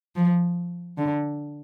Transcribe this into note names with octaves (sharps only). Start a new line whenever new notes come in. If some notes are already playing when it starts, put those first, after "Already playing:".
F3
D3